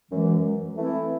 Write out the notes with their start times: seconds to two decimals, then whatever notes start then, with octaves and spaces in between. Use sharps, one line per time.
0.12 F#2 E3 G#3
0.77 E3 A3 C4 E4